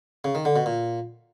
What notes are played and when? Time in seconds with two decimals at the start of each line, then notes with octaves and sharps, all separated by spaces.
0.24 C#3
0.35 D#3
0.45 D3
0.56 B2
0.66 A#2